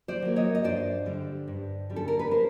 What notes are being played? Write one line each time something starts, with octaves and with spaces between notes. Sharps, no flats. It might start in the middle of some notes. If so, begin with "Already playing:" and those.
C5 D5
F#3 A#3
C#5 D#5
D#5
G2 C5 D5
D3 G3
G2
D3 G3
A4
A#4
B4
A#4 C5